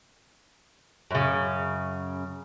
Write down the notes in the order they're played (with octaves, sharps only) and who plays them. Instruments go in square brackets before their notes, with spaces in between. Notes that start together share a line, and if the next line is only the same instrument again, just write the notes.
[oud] F#2 C#3